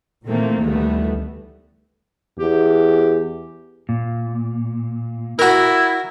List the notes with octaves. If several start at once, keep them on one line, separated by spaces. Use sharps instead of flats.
A#2 D#3 E3 A3 A#3 C4
D2 D#3 E3 G3 A3 B3
E2 G4
A#2
E4 F#4 A#4